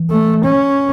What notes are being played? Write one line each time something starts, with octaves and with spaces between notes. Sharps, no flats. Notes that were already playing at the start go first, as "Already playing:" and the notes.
Already playing: E3
A3
C#4